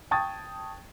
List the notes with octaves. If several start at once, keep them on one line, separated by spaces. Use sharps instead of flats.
G5 A5 C#6 D#6 G#6 A6